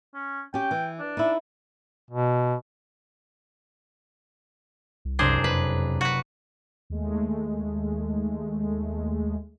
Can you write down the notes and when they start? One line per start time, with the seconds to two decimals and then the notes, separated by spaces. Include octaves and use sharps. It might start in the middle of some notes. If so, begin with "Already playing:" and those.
0.15 C#4
0.54 C#4 G4 G5
0.71 E3
0.99 D4
1.17 D#4 E4
2.11 B2
5.05 C2
5.19 F#1 C3 D4 G#4 C5 A#5
5.44 F2 B4
6.01 F#4 B4
6.90 D#2 G#3 A3